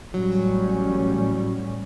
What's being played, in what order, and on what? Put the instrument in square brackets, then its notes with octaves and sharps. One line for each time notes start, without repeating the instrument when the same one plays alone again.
[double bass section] A1 G3 C#4 [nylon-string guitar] F#3